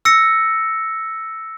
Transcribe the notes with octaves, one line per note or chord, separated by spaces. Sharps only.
E6 A#6 C#7